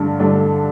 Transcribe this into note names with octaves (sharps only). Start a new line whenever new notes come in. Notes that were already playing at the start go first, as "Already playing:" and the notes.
Already playing: G2 D3 A3 D4
G2 D3 A3 D4